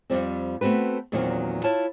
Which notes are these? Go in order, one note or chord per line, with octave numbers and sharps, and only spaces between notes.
F2 G#2 G3 C4
A3 B3 C4 F#4 B4
E2 A#2 D#3 F#3 C4 F#4
E4 F4 C#5 A5